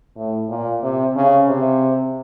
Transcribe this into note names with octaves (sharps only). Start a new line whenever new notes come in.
A2
A#2
C3
C#3
C3